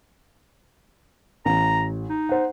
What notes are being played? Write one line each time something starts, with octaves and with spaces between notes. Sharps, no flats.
A1 A#5
D#4
C5 F#5